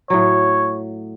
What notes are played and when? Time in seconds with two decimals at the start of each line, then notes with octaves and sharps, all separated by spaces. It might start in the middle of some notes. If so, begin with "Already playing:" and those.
0.10 A2 F#3 C#5